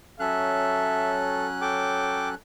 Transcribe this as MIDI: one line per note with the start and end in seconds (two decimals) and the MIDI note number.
0.20 2.35 54
0.20 2.35 61
0.20 1.47 69
0.20 1.21 76
0.20 2.35 90
1.61 2.35 69
1.61 2.29 79
1.61 2.29 86